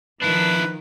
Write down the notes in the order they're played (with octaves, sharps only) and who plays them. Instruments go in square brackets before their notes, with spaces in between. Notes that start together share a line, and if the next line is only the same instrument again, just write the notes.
[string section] D#3 F3 [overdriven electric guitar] D4 E4 [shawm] B4